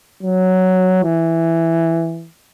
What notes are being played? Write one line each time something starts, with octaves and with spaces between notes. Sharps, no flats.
F#3
E3